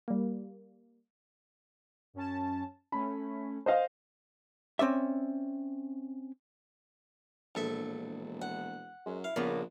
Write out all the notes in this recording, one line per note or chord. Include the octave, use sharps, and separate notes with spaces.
G3 A#3
F#2 C#4 A5
A3 C#4 B5
C5 D#5 F5
C4 C#4 D5 E5
E1 A#1 A4 E5
F#5
F#2 G#3
E4 F5
A#1 C#3 A#3 B3